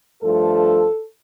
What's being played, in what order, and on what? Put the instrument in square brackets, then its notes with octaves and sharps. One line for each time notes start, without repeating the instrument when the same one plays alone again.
[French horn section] G2 F3 A3 A4